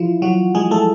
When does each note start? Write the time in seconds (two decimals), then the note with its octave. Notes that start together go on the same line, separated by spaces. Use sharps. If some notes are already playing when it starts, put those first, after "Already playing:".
Already playing: E3 F3 E4 F4
0.22 F#3 F#4
0.55 G#3 G#4
0.71 A3 A4